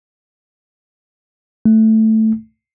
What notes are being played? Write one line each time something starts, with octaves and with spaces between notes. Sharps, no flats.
A3